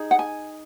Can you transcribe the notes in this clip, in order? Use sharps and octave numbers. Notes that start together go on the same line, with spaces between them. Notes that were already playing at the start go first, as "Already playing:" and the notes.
Already playing: D#4 G#4
F#5
G#5